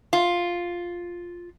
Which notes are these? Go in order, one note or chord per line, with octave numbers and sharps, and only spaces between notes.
F4